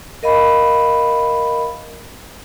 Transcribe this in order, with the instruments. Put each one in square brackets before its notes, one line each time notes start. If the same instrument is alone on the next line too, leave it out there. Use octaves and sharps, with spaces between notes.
[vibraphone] A#4 D#5 F5 B5